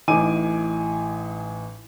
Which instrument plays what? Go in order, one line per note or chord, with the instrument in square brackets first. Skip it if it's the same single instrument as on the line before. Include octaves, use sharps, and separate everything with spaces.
[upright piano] A1 A2 D#4 G#5 D6 D#7